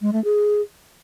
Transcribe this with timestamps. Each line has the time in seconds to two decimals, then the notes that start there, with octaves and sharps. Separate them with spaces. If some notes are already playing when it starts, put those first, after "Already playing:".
0.01 G#3
0.13 A3
0.24 G#4